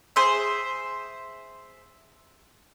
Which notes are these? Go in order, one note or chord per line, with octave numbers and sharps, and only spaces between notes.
G#4 C5 E5